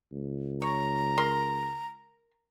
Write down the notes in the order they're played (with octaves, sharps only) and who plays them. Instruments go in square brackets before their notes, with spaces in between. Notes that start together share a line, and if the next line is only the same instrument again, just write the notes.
[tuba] C#2
[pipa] C#5 [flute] A#5
[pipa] A#4 C6